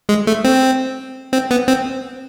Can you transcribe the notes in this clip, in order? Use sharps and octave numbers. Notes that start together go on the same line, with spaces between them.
G#3
A3
C4
C4
B3
C4